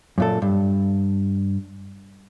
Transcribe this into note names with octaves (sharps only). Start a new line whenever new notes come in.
F#2 A#2 A4
G2